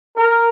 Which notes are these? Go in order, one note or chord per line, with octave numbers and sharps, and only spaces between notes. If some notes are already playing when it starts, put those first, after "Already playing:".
A#4